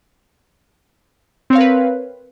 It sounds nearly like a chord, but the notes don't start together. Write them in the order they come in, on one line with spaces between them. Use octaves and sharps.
C4 C#5 F5 A#4 B4